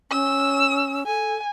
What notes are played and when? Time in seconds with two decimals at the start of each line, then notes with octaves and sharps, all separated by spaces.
0.11 C#4 E6
1.07 A4 G#5